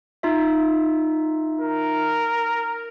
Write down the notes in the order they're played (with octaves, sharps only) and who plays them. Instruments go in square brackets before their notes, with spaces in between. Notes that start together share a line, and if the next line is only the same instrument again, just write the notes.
[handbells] D#4 F4 E5
[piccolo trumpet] A#4